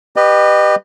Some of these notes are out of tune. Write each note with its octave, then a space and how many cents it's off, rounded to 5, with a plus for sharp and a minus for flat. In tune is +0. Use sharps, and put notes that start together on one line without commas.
G4 +0 B4 +0 D#5 -30